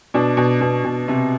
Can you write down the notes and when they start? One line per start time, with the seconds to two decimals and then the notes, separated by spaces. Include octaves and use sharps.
0.14 B2 D4
0.37 B2
0.61 B2
0.84 B2
1.08 C3